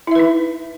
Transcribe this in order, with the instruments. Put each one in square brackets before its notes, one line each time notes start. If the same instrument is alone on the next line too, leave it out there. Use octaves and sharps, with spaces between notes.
[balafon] E4
E5
B4
D#4